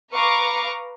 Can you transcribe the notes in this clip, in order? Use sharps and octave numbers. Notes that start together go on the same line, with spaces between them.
B4 F5 A#5 C#6 D6